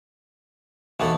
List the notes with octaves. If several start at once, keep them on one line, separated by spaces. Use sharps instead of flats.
D#2 B2 E3 B3 A4